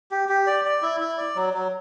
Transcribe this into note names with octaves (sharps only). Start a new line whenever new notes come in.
G4
G4
D5
D5
E4
E4
D5
F#3
F#3